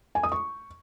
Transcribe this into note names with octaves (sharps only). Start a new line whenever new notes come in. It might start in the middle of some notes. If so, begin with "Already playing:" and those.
G#5
D#6
C#6